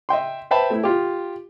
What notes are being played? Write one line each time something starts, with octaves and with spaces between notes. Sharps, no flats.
D#5 E5 G5 C6
B4 C5 E5 G5 A5 B5
A3 E4
F4 G4